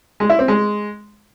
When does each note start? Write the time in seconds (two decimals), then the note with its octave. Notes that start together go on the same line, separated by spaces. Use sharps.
0.20 G#3
0.30 E4
0.39 C4
0.48 G#3